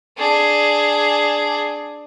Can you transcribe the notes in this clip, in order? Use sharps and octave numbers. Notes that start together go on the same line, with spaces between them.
D4 G#4